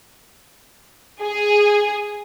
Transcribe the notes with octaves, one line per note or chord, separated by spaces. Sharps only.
G#4